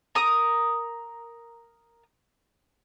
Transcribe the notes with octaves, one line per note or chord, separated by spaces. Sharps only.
A#4 D#6